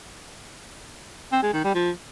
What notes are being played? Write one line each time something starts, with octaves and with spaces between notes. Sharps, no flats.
C4
G#3
D#3
G3
F3